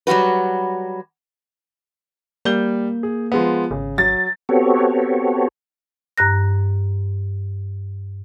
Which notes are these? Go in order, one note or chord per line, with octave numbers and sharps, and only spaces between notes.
F#3 G3 F4 F#4 B4
G3 A#3 G6 G7
G#4
F3 G#3 B3
G#1 C#3
F#3 A6
B3 C4 F#4 G4 A4 C#5
G2 A#5 F#6 A#6